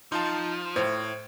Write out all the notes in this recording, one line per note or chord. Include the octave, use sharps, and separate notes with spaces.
F3 D#4 F4 A5
A2 C5